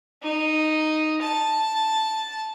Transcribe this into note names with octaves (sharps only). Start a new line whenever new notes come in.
D#4
A5